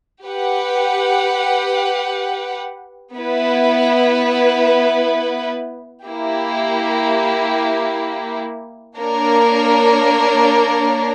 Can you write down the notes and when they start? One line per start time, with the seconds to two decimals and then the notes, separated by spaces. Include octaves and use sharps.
0.24 G4 B4 F#5
3.15 B3 E4 B4
6.06 A#3 E4 G4
8.96 A#3 D4 A#4 C#5